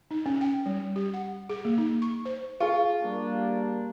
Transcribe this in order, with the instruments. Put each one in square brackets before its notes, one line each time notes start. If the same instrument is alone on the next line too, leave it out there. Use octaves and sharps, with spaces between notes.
[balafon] D#4
C#4
G5
G3
G4
F#5
G#4
A#3
D#4
C#6
C5
[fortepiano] F4 [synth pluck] G#4 C#6
[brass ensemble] G3 A#3 D4